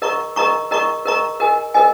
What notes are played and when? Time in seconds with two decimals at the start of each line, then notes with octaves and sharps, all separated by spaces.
0.02 A#4 D#5 A#5 C#6
0.36 A#4 D#5 A#5 C#6
0.71 A#4 D#5 A#5 C#6
1.05 A#4 D#5 A#5 C#6
1.40 A#4 D#5 G#5
1.74 A#4 D#5 G#5